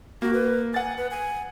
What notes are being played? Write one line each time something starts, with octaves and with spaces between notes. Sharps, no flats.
A#3 F#4
B4
F#5 G#5 A6
B4
G#5